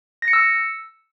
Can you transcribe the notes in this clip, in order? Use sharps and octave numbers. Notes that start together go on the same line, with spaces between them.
A#6
C#7
E6